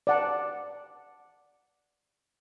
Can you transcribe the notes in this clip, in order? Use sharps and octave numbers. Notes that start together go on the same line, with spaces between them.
D5 F#5 A5